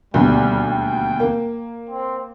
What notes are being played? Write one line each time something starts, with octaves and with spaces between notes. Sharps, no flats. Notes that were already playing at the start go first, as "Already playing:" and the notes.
D#1 D2 B2 G3
G5
A#3
C4